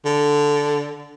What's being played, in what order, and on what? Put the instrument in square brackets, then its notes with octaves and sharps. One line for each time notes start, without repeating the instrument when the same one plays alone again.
[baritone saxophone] D3